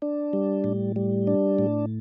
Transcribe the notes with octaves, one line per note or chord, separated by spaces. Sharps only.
D4
G3
A2
G3
D4
A2